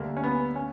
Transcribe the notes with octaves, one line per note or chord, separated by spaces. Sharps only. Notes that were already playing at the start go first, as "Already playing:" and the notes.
Already playing: D2 D3 G3 A#3
C#4
B3
A#3 C#4